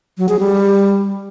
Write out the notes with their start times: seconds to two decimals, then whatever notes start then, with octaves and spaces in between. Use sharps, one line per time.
0.18 F#3
0.29 G#4
0.40 G3